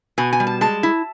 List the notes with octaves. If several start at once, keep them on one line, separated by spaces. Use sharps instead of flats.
B2 G#5
G#5
G3
A5
G#3 A5
E4